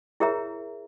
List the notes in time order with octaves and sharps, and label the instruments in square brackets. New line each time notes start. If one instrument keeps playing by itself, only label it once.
[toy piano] E4 G#4 A#4 C#5 E5 A#5